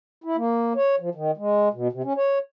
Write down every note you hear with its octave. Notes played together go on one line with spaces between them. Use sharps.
E4
A#3
C#5
F3
D#3
G#3
B2
C3
C#4
C#5